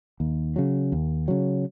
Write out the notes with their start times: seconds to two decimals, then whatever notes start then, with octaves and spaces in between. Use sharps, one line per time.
0.20 D#2
0.56 C#3 F#3
0.92 D#2
1.28 C#3 F#3